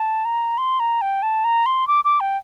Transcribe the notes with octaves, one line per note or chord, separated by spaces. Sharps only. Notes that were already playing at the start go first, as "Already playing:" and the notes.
Already playing: A5
A#5
C6
A#5
G5
A5
A#5
C6
D6
D6
G5